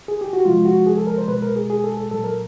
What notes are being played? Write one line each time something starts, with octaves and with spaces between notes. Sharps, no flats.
G#4
G4
F#4
C3 F3 G#3 F4
F#4
G#4
A4
A#4
C5
B2 G#3 B4
A#4
G#4
G#4
A4
A4
A#2 F#3 A4
A#4